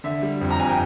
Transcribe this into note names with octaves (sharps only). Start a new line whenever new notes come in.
D3 E5
G3
F2
A#5
F2 G#5
G5